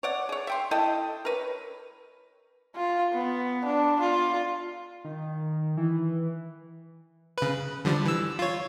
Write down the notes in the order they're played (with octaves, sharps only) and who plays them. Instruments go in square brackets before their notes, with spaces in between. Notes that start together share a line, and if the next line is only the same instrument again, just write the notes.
[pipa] C#5 D5 F#5
G#4 C#5
E5 G5 C6
E4 A4 D#5 G5
A#4 B4 C#5
[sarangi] F4
B3
D4
F4
[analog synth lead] D#3
E3
[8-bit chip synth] C#3 B4
D3 F3 G3
E3 E6
F4 C#5